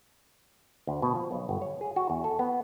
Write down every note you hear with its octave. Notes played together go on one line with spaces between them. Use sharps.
D2
B2
F3
B1
G1
C#5
G#4
F#4
E2
A4
B3